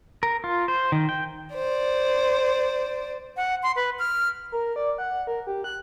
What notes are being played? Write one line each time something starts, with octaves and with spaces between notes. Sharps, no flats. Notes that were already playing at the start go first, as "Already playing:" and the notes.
A#4
F4
C5
D#3
G5
C5 D5
F#5
C6
B4
F6
A#4
D5
F#5
A#4
G4
F#6